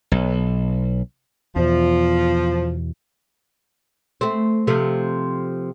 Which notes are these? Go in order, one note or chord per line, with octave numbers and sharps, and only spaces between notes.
B1
E2 B2 F3
A3 C4
C3 F3 A3